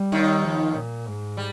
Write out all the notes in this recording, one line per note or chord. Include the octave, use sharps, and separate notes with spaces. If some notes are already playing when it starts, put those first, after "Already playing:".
Already playing: G3
D#2 D#3
F3
A#2
G#2
G3